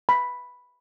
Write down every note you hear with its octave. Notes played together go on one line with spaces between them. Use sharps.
B5